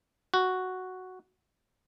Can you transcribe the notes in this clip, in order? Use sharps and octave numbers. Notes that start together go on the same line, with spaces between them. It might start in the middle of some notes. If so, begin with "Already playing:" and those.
F#4